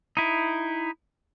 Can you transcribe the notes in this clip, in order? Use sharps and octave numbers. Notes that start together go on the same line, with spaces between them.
D#4 E4